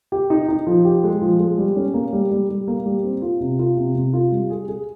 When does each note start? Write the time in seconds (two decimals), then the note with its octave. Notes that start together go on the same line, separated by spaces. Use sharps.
0.12 G4
0.30 D#4
0.48 D#4
0.67 F3
0.85 G4
1.04 G#3
1.21 F3
1.40 G#3
1.58 G3
1.76 C#4
1.94 A#3
2.13 G3
2.31 G3
2.49 G3
2.68 A#3
2.86 G3
3.04 C4
3.22 F4
3.40 C3
3.59 F4
3.77 C3
3.95 C3
4.13 F4
4.32 G3
4.50 G#4
4.68 G#4